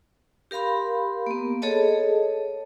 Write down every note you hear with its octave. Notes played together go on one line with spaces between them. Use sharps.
G4 A#4 F5 B5 C6
A#3 B3
G#4 A4 C#5 D#5 A5